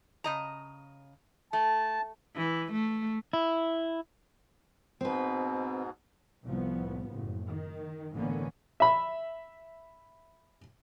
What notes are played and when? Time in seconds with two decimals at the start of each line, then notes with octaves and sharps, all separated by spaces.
0.24 C#3 D#5 A#5
1.53 A3 A5
2.36 E3
2.72 A3
3.33 E4
5.01 G#2 B2 C4 B4
6.44 C2 A2 F3 B3
7.09 F#1 A2
7.46 D#3
8.13 A1 D3 E3 A#3 B3 C#4
8.80 E5 B5